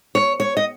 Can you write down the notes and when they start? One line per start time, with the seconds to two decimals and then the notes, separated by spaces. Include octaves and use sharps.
0.15 C#5
0.40 C#5
0.57 D#5